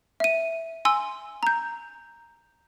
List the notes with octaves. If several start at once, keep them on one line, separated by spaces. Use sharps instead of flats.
E5 D#7
G#5 C6 E6
A#5 G6